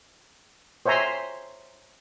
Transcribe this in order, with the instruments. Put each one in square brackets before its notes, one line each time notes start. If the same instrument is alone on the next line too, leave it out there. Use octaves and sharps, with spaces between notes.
[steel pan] C5 C#5 E5 G#5 A#5 C6